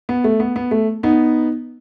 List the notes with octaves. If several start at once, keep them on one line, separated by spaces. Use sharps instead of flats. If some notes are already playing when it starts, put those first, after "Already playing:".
B3
A3
B3
B3
A3
B3 D#4